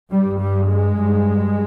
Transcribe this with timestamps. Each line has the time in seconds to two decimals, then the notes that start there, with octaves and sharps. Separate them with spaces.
0.11 G2 G3
0.39 G3
0.68 G#3
0.97 G2